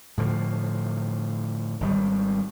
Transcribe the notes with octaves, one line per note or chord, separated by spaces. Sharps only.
A2 D3 F3
G#1 D#3 G3